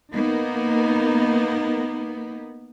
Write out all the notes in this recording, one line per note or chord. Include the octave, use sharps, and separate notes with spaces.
A#3 B3 D#4